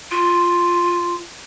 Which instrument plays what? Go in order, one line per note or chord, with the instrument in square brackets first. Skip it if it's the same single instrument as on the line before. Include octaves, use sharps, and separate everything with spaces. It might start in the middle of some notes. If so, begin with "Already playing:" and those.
[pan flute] F4